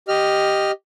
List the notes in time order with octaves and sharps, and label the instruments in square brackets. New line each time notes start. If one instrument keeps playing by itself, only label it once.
[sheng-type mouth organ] G4 D#5 F6